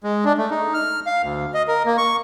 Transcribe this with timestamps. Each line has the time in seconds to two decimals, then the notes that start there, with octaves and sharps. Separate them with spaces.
0.04 G#3
0.25 D4
0.38 A3
0.51 D#4
0.74 F6
1.06 F5
1.23 D2
1.54 D#5
1.68 A#4
1.86 A#3
1.98 C#6